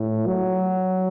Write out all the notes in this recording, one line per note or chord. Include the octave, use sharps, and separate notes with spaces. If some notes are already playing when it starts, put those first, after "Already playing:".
Already playing: A2
F#3